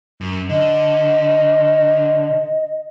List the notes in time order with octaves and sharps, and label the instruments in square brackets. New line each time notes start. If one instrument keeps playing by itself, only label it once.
[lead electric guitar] F#2
[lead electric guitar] D3 [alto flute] D#5